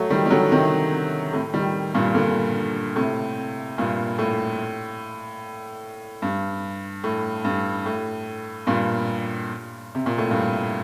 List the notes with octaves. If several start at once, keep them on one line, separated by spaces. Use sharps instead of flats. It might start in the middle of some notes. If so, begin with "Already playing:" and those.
Already playing: F#3 A3
D#3 G3
G3
D3 F#3
C3 D#3
A2 C3
D#3 G3
G2 A#2
A#2 D3
A2 C3
G2 A#2
A2
G2
A2
G2
A2
G2 A#2
C3
A#2
A2
G2